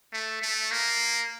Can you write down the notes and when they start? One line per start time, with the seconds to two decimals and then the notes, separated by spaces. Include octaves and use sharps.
0.12 A3
0.42 A3
0.71 A#3